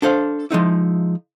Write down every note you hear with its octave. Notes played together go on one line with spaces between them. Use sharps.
D4 A4 C5 F5
F3 G#3 D#4 E4